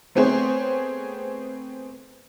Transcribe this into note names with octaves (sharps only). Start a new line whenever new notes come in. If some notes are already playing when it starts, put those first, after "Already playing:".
A3 B3 C4 G#4 C5 C#5